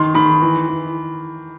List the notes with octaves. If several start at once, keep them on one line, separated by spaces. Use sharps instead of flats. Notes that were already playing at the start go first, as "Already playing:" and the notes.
Already playing: D#3 C6
D#3 B5
E3
E3